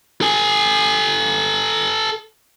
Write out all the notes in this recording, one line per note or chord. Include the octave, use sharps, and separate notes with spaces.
A4 G#5